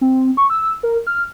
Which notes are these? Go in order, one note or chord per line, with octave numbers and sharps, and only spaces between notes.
C4
C#6
E6
A#4
F6